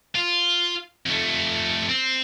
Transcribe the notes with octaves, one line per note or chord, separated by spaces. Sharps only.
F4
F2 A3
C4